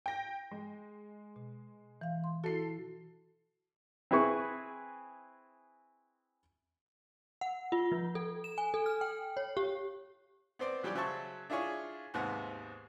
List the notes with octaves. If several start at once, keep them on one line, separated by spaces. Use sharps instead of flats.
G5 A#6
G#3
B2
E3 F5
C6
E4 F#4 A4 C7
C4 E4 G#4 B4 C#6
F#5
F4
F3
A4
E7
G#5
A4
F6
G5
C#5
G4
B3 C4 C5 D5
E3 F#3 G3 G4 D5
C#3 F#3 C5 E5 A5 C#6
D4 E4 F4 G#4 C#5
D#2 G#2 C3 B3 F#5